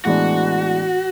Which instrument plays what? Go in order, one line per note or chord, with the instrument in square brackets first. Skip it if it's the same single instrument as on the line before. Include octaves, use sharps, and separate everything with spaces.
[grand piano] A2 E3 G#3 B3 D4 [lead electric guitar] F#4